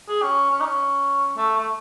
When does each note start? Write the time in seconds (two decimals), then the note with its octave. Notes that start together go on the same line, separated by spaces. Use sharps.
0.08 G#4
0.22 C#4
0.51 C#4
0.60 D#4
0.65 C#4
1.37 A3
1.58 A3